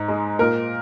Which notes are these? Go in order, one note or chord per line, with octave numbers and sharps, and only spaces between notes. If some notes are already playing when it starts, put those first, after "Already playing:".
Already playing: G#2 A#5
G#3
A#2 A#4